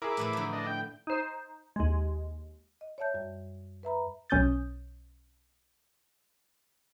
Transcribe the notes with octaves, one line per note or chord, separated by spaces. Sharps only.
E4 G#4 A#4 D6
A2 E3 A3
D3 F3
D4 D#5
G5
D#4 C5
D#2 G#3
D#5
C#5 D5 E5 A5 G6
F#2 G3
B4 E5 A#5 B5
B1 C#4 D#6 G6 A6